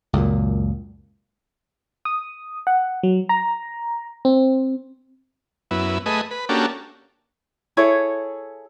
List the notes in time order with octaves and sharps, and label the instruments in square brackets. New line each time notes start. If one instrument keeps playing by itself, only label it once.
[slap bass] C#2 F#2 A#2
[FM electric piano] D#6
F#5
F#3
A#5
C4
[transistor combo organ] F#2 B3 E4
A3 G#4 B4 D#5
B4
A#3 C#4 D4 F#4 G4 A4
[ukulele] E4 G#4 A4 C#5